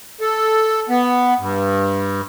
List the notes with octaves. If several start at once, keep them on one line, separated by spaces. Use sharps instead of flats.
A4
B3
G2